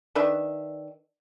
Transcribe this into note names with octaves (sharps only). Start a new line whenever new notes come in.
D#3 D4 B4 E5